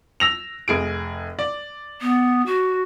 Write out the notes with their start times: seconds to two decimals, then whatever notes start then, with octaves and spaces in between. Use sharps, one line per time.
0.20 E6 A#6 F7
0.68 F1 G#4 D7
1.39 D5
2.01 B3
2.46 F#4